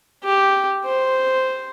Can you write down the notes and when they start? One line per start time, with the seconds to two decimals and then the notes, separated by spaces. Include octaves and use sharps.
0.24 G4
0.85 C5